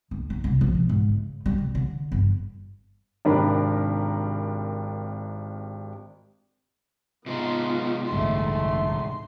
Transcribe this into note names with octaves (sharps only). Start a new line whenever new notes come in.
D2
D#4
C2
F3
B2
G#2
C#3
G3
C3
D3
G1
G#1 C3 D4 A#4 B5
C3 G#3 B3 D#4 F4
A1 D2 G2 A3 C6